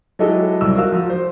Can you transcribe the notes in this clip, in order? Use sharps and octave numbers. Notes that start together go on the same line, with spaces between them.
F#3 G#3 E4 G4 A4 D#5
C2 E6
F#4 A#4 F5 E6
F3
C5